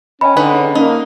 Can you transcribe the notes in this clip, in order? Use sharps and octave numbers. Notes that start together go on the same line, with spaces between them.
C#4 D#5 G5 B5
D3 C#4 D#4 B4
D4 G#4 E5
A#3 C#4 D#4